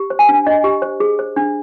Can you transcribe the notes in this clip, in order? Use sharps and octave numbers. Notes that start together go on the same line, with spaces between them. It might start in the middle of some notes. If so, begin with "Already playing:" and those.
Already playing: G4
C5
G#5
D4
D4 D#5
G4
C5
G#4
C5
D4